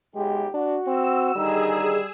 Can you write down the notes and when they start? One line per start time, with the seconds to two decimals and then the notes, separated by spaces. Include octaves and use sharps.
0.15 B1 G#3 G4
0.54 D4 F#4
0.87 C4 E6
1.36 D3 D#3 G3 D#4 G#4 E6